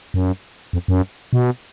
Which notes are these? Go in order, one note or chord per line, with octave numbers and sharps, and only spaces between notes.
F#2
F2
F#2
B2